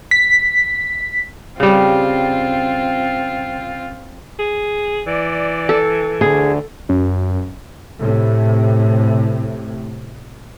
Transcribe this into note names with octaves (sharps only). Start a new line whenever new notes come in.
B6
C#3 G3 C4 F4
G#4
E3 D5
A4
D2 D3 G#4
F#2
A2 C3